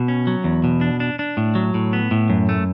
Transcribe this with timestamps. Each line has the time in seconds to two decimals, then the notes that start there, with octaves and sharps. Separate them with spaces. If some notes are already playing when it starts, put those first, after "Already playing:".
Already playing: B2
0.08 C#4
0.27 F#3
0.44 E2
0.64 B2
0.81 D4
1.00 D4
1.19 D4
1.37 A2
1.55 F#3
1.74 A2
1.93 B3
2.11 A2
2.30 F#2
2.49 A3